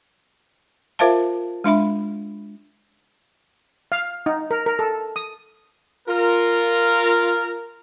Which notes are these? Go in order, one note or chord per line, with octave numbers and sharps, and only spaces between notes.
F4 A#4 C5 E5 F5 A5
G#3 D4 E5 B5
F5
D#4
A#4
A#4
A4
D#6
F4 A#4